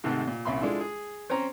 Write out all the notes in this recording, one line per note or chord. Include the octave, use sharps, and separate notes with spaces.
G#2 C3 D#3 A3 F#5 F#6
A#2
C2 A#2 C#4 E5 B5 C6
G#3 D4 E4 F4 A4
G#4
C4 C#4 C5 A#5